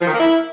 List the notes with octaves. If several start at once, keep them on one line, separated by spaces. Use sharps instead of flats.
F3
D#3
A#3
E4